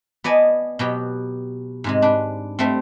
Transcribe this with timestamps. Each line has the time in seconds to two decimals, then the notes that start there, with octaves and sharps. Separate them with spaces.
0.24 B3 D5 D#5 G#5 A5
0.79 B2 F#3 G4
1.84 G#2 C3 G#3
2.02 D4 B4
2.59 G3 A3 C4